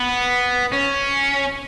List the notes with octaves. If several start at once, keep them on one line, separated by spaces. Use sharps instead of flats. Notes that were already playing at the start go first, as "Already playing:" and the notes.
Already playing: B3
C#4